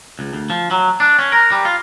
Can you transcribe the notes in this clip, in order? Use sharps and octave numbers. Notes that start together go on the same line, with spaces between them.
C#2
D2
F3
F#3
D4
C#4
A#4
G3
F4